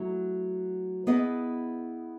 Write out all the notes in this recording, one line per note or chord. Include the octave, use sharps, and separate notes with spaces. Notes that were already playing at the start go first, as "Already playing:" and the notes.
Already playing: F#3 A3 E4
B3 E4 G#4 B4 D#5